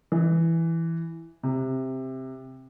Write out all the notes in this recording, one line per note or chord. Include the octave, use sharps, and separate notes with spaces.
E3
C3